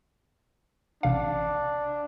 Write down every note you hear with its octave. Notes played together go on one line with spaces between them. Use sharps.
A1 C3 D4 F5